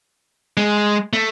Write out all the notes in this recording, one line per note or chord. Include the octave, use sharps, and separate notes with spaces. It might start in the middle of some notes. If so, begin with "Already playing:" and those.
G#3
A3